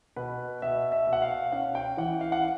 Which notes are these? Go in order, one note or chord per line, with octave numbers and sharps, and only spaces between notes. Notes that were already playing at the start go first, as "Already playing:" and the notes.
B2 B4
B2 E5
E5
B2
F#5
F5
C#4 F#5
G5
E3 F#5
F5
F#5